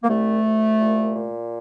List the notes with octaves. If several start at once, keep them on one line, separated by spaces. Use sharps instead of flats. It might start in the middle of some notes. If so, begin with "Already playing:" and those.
A#3
C2 A3
C2
A#2
A#2